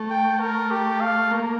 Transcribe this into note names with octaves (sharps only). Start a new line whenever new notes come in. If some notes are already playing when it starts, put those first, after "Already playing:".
Already playing: A3
G5
A#4
G4
F5
A#3